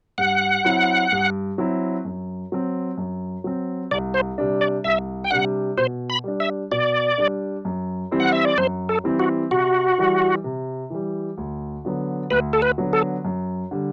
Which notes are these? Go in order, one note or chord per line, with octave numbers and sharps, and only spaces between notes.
G2 F#5
F#3 C4 E4
G2
F#3 C4 E4
F#2
F#3 C4
F#2
F#3 C4
C2 D5
C5
C3 G3 D4
D5
C2 E5
G5
C3 G3 D4 F#5
B2 C5
B5
G3 D4
E5
B2 D5
G3 D4
F#2
E3 G3 C4 E4
F#5
E5
D5
F#2 C5
A4
E3 G3 C4 E4
F#4
C3 F#4
E3 G3
C3
E3 G3
D2
D3 F#3 B3
D2 B4
A4
B4
D3 F#3 B3
A4
F#2
D3 G3